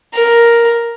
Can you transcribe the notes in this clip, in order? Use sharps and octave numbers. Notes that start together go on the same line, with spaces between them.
A#4